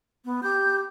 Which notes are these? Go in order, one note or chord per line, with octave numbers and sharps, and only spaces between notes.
B3
G4 G6